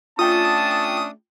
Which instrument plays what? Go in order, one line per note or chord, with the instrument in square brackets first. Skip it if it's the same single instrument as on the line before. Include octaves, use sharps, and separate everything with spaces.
[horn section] A3 C#4 D4 [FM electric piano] F4 G5 [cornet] A5 [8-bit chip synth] D#6